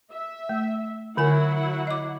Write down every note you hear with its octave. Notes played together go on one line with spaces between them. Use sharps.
E5
A3
D3 F#3 E4 A#4 F#5 G#5
D#5 D6